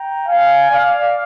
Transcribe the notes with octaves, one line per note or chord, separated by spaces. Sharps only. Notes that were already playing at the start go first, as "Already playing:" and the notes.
Already playing: G5 A#5
F5 G#5
D5 F5